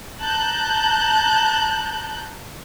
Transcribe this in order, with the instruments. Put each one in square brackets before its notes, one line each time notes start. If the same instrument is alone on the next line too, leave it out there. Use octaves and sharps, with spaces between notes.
[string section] A5 A#5 F#6 G6